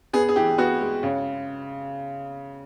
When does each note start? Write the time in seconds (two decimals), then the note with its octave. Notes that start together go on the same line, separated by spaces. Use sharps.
0.13 B3 G#4
0.29 G#4
0.36 E3 G4
0.58 B3 F#4
0.80 G#3
1.03 C#3